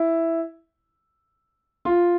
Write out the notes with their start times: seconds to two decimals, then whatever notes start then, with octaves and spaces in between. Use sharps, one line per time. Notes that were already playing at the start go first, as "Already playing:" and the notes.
Already playing: E4
1.85 F4